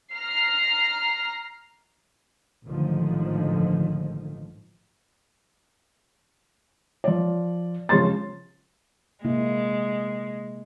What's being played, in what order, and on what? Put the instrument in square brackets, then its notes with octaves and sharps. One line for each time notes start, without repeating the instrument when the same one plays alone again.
[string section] A#5 F6 C7
[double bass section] A1 G#2 D3 D#3 F3
[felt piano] F3 D5
C#3 F3 G#3 C#5 C6 A6
[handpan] C3 A#3 E4 [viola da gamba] G#3